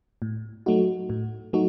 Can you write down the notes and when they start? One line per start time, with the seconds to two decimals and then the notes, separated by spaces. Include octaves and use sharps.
0.22 A2
0.66 F#3 A3 D#4 F#4
1.10 A2
1.53 F#3 A3 D#4 F#4